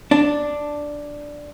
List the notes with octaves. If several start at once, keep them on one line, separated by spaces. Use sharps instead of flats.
D4